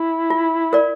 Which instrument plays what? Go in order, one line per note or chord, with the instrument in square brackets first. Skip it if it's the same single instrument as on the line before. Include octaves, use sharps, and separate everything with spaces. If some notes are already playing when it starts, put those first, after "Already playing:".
Already playing: [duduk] E4
[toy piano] F4
A#4 D5